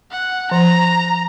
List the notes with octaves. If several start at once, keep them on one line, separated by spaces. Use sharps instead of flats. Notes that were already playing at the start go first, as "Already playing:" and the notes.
F#5
F3 A#5